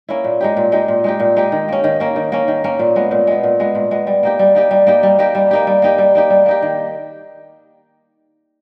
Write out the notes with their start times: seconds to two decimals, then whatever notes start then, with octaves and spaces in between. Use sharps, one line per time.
0.09 A#3 C#4 E4
0.24 A#2
0.41 G#3 D#4 G4
0.57 A#2
0.72 G#3 D#4 G4
0.88 A#2
1.04 G#3 D#4 G4
1.20 A#2
1.36 G#3 D#4 G4
1.52 D#3
1.68 A#3 C#4
1.84 D#3
2.00 A#3 C#4
2.16 D#3
2.32 A#3 C#4
2.48 D#3
2.64 A#3 C#4
2.79 A#2
2.96 G#3 B3
3.11 A#2
3.27 G#3 B3
3.43 A#2
3.60 G#3 B3
3.75 A#2
3.91 G#3 B3
4.07 G3
4.23 A#3 D#4 G4
4.39 G3
4.55 A#3 D#4 G4
4.71 G3
4.87 A#3 D#4 G4
5.03 G3
5.19 A#3 D#4 G4
5.35 G3
5.51 A#3 D#4 G4
5.67 G3
5.82 A#3 D#4 G4
5.98 G3
6.15 A#3 D#4 G4
6.30 G3
6.46 A#3 D#4 G4
6.62 D#3